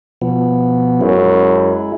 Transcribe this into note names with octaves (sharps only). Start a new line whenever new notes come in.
B2 F3 B3
F#2 G#3 E4